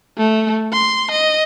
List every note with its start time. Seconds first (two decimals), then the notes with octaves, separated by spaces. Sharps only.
0.17 A3
0.73 C6
1.11 D#5